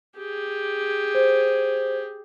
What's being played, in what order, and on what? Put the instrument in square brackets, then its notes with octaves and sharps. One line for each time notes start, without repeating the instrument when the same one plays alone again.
[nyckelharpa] G4 G#4
[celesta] C5